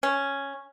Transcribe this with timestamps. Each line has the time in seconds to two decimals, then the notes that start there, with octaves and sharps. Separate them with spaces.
0.03 C#4